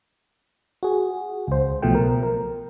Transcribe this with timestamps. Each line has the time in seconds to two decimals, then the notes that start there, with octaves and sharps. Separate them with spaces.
0.83 F#4 G#4
1.47 C#2 C5
1.82 B1 B2 F3 A3 G5
1.95 A#4
2.23 A#4